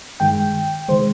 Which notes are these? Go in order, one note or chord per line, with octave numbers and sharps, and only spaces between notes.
G2 D#3 G#3 G5
C3 D#3 G#3 C5